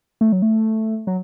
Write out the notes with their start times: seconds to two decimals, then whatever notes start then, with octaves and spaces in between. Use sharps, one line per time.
0.21 A3
0.32 F#3
0.42 A3
1.07 F#3